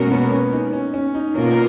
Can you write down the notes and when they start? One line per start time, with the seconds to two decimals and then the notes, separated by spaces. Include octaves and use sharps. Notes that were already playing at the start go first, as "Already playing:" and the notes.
Already playing: B2 G#3 A#3 C#4 F#4 A#4
0.11 B3
0.32 C#4
0.53 D#4
0.73 C#4
0.94 C#4
1.15 D#4
1.35 B2 A#3 C#4 F4 A#4